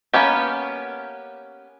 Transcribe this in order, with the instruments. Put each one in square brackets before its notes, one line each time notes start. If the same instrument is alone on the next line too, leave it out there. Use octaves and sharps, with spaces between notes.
[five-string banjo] A#3 B3 C#4 G4